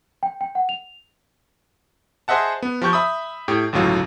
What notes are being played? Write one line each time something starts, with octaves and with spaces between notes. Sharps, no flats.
G5
G5
F#5
F7
G#4 C5 D#5 E5 F#5 A5
B3
F3 G4 C#6 G6
E5 B5 D#6
A2 G4
G1 C#2 A2 F#3 F4